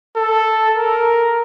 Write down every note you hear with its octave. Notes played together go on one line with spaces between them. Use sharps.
A4
A#4